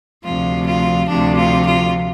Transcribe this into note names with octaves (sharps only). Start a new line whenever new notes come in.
D2 C3 F3 F4
F4
D2 C3 F3 D4
F4
F4